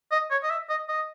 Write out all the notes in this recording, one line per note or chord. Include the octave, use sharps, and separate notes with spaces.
D#5
C#5
D#5
E5
D#5
D#5